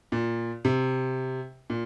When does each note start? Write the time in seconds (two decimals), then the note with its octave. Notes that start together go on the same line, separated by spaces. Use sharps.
0.12 A#2
0.65 C3
1.70 A#2